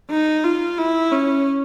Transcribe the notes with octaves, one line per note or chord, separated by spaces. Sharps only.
D#4
F4
E4
C#4